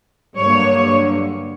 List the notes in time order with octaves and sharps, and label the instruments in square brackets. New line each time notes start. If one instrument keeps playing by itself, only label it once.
[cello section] G2 D3 F#3 A#3 C#5